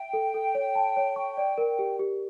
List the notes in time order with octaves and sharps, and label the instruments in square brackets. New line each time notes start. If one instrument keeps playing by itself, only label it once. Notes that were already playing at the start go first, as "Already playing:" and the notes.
Already playing: [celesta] E5 [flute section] G5
[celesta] A4
A4
C#5
A5
C#5
C#6
D5
A#4
G4
G4